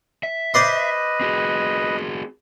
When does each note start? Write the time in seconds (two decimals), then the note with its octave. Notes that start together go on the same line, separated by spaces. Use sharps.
0.23 E5
0.54 B4 C5 D5 D#5 C6
1.21 C4 F#4 G#4